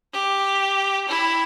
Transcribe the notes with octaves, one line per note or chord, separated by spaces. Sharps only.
G4
E4